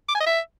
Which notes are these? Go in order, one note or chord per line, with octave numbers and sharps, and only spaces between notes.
D6
G#5
D#5
E5